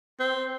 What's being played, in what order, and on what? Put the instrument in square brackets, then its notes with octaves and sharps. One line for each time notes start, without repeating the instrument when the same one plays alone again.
[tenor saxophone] C4